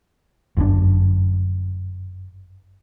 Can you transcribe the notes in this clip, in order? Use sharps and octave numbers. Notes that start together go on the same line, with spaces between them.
G1 F#2 C#3 D4